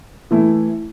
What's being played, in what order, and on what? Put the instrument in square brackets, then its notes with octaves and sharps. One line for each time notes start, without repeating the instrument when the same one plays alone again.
[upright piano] E3 A3 E4